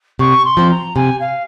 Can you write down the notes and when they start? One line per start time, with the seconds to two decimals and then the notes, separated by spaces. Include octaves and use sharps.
0.19 C3 C#6
0.45 C6
0.57 F3 C4
0.71 A#5
0.95 C3 G#5
1.20 F5